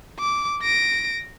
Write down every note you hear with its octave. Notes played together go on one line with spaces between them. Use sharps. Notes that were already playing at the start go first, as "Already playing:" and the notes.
D6
A#6 D7